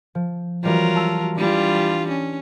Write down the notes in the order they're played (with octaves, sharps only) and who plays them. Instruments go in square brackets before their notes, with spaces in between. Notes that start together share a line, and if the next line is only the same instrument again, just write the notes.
[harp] F3
[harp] E3 G3 C4 [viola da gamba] F#3 F4 A#4
[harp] A5 E6
[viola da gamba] E3 G3 F4 [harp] D4
[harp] C6
[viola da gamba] C#4